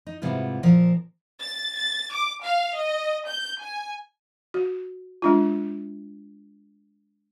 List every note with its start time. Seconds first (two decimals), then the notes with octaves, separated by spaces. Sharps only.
0.07 D#4
0.22 G#2 C3 G3 B3 E4 F4
0.63 A#2 F3 A#4
1.41 A6
1.77 A6
2.13 D6
2.43 F5
2.76 D#5
3.28 G6
3.62 G#5
4.54 F#4
5.22 G#3 D4 F4